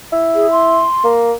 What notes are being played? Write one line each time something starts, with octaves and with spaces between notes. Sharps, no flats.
E4
G#4
C6
A#3